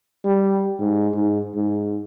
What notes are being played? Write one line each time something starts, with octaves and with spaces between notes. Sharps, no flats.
G3
G#2
G#2
G#2